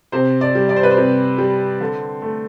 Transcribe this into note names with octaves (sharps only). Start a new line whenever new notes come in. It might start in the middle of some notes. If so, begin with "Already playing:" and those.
C3 C5
D5
G3
D5
C5
B4
C5
C3
G3
D3
A3